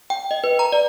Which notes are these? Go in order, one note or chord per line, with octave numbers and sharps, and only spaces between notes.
G5
D#5
B4
A#5
D5